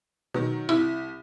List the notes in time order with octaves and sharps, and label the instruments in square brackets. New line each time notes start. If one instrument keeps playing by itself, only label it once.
[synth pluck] B2 [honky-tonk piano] D#3 F#3
[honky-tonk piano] C2 [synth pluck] E4